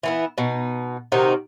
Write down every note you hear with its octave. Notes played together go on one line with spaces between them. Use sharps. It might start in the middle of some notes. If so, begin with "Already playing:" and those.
E3 B3 E4
B2 D#4
C3 D#3 D#4 F#4